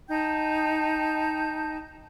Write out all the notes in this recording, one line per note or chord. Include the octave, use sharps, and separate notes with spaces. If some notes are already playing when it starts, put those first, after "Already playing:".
D#4 G5 A5 G6